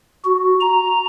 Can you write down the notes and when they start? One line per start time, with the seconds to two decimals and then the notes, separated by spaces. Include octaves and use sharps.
0.25 F#4
0.61 A#5